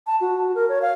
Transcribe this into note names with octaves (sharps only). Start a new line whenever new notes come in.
A5
F#4
A#4
C#5
F5